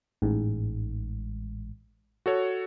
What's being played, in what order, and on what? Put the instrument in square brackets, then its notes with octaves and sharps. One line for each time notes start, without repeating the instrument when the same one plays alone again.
[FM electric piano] A1 G#2
[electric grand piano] F#4 A4 C#5